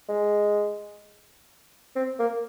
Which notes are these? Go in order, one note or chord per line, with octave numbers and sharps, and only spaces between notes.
G#3
C4
A#3